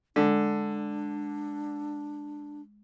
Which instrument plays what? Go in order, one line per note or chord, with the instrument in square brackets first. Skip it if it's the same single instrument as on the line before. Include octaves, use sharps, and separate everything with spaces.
[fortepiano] D3 [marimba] G#3 [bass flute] D4